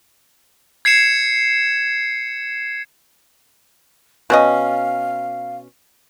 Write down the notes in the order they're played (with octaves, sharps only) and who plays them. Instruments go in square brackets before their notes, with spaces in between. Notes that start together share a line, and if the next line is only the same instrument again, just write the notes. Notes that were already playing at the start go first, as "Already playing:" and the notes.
[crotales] G#6 C7 C#7 E7
[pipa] B2 C#4 D#5 [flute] F5